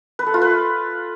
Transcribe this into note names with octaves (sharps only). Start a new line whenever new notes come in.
B4
A4
F4
B4